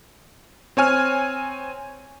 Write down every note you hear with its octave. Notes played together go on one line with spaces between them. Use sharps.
C4 C#5 G#5 F6